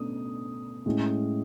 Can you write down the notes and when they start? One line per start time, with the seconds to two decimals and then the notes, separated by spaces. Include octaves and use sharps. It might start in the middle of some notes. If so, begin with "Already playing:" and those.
Already playing: B2 A3 C#4 D#6
0.86 A2 G#3 C#4